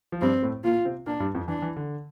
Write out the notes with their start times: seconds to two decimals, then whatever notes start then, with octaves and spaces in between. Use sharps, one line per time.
0.12 F3
0.21 G2 G3 C4
0.42 A2 A3
0.64 A#2 A#3 F4
0.85 C3 C4
1.06 A#2 A#3 D4
1.20 G2 G3
1.35 F2 F3
1.48 E3 D4
1.62 E3
1.76 D3